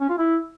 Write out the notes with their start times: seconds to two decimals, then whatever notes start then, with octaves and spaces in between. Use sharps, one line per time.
0.01 C#4
0.10 F4
0.18 E4